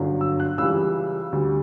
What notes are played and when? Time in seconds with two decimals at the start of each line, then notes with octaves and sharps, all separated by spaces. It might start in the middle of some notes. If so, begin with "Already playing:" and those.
Already playing: G1 F#2 D3 F#3
0.21 E6
0.40 F#6
0.58 C#2 C#3 E3 G3 E6
1.32 D2 D3 G3